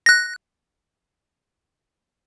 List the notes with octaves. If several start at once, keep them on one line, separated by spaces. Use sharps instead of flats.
F#6 A#6